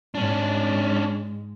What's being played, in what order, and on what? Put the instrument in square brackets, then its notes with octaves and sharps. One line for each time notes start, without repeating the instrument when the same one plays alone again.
[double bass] G#2 G#3 [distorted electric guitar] C#4 D4